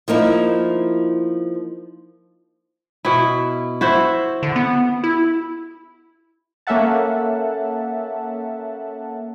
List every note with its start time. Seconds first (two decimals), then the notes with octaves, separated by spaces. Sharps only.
0.08 F3 A#3 D#4 E4
3.05 B2 E4
3.81 E4 F#4 C5
4.43 D3
4.56 B3
5.04 E4
6.67 A#3 C#4 A4 E5 F#5 A5